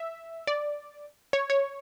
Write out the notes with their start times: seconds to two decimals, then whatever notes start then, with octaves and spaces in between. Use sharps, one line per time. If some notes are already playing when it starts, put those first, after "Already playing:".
Already playing: E5
0.47 D5
1.33 C#5
1.50 C#5